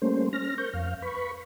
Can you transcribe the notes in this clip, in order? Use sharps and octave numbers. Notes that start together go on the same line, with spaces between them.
G3 A3 A#3 C#4 C5
C#4 F6 A#6
A#4 C5 C#6 G6
F2 F5 F6
B4 B5 C#6